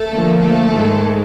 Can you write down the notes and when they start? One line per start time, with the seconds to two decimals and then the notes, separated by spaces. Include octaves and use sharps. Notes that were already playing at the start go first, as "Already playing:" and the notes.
Already playing: A3 A4
0.08 D3 F3 A#3
0.40 A3 A4
0.72 G#2 D#3 G#3